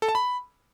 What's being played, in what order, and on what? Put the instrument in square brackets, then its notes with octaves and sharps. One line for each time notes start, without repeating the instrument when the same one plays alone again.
[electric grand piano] A4
A5
B5